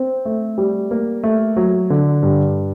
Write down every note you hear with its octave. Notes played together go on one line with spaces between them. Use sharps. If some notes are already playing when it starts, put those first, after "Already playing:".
Already playing: C4
A3
G3
A#3
A3
F#3
D3
G2